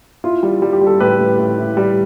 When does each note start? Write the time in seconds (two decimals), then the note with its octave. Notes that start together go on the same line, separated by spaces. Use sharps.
0.24 E4 F4
0.43 G3
0.62 G3
0.73 G4
0.81 G3
0.87 A4
1.00 A2 G4 B4
1.19 A2
1.38 A2
1.58 E4
1.77 G3